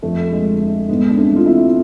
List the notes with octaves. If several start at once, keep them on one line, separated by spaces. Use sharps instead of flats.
F2 A3
G#3
D3
A3
G#2 G#3 B3
D4
A3 C4
E3 F4
C4 E4